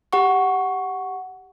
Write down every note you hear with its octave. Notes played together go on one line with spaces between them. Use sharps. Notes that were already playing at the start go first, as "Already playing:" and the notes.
G4 F#5 C#6